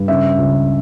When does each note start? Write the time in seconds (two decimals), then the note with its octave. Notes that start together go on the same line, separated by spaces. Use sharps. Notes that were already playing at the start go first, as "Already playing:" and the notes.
Already playing: G2
0.08 C#3 E5
0.38 C#2